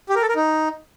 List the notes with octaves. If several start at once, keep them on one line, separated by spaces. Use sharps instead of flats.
G4
A#4
A4
A#4
D#4